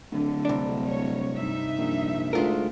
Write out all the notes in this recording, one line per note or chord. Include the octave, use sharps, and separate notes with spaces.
D1 D3
C2 D4
C#5
G2 D#4 E5
A#1
D2 G#3 F4 A#4